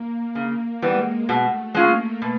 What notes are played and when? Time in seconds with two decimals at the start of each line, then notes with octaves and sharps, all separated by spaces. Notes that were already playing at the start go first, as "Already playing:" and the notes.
Already playing: A#3
0.35 C#3
0.82 E3 G3 G#3 B3
1.29 B2 A3
1.74 G#3 A#3 C#4 F4
2.22 B2